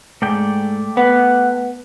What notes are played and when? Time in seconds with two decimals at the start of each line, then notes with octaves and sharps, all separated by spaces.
0.22 G#2 A3 D5 G5
0.97 B3 F#5